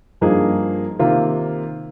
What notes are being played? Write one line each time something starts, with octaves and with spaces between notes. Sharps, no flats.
G2 F3 A#3 D#4 G#4
C3 D#3 A#3 F4